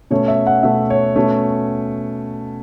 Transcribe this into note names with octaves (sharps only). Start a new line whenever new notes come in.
B2 A3 C#4 C#5
E5
F#5
B2 A3 C#4 E5
C#5
B2 A3 C#4